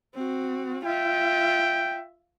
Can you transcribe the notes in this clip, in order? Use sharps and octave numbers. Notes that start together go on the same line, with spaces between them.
C4 F#4
F4 E5 G5